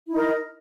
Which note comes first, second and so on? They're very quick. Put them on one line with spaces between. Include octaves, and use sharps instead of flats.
E4 D#4 A#4